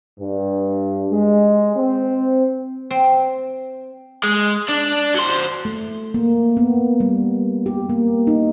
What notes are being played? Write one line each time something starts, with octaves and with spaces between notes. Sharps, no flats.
G2
G#3
C4
C4
G#3
D4
F#3 C5
A3
A#3
B3
G3
G4
A#3
D#4